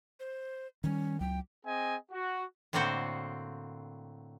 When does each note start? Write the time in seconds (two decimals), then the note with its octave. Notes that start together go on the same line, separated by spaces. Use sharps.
0.20 C5
0.84 D#3 G3 C#4
1.20 C#2 F#3 G5
1.65 C4 G#4 D#5 G#5
2.12 F#4
2.73 A2 D3 A#3 C4 F#4 C5